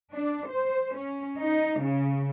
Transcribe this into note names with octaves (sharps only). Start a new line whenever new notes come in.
D4
C5
C#4
D#4
C#3